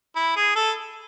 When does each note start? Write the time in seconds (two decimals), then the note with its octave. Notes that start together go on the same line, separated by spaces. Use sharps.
0.16 E4
0.36 G#4
0.56 A4